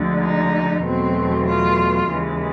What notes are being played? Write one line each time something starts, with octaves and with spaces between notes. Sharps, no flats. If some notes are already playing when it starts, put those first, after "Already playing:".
Already playing: D2 D3 F3 G#3
D#4
E2 B2 F#3 A3 C4
F4
D#2 C#3 E3 G#3